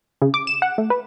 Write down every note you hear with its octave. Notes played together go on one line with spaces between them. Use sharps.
C#3
D6
E7
F#5
A3
B4